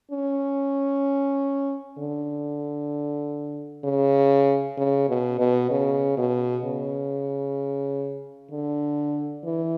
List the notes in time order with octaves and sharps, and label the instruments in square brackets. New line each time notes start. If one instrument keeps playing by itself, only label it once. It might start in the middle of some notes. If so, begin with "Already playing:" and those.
[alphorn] C#4
D3
C#3
C#3
B2
B2
C#3
B2
C#3
D3
E3